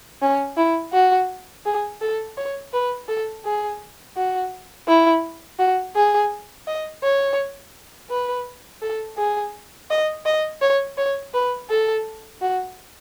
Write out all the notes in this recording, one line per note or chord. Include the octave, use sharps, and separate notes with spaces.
C#4
E4
F#4
G#4
A4
C#5
B4
A4
G#4
F#4
E4
F#4
G#4
D#5
C#5
B4
A4
G#4
D#5
D#5
C#5
C#5
B4
A4
F#4